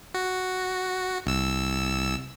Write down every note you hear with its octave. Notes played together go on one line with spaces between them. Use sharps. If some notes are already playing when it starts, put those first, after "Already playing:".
F#4
C2 E6